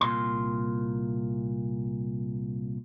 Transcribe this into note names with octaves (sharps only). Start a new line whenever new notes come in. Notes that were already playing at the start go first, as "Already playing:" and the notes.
C2 A#2 C6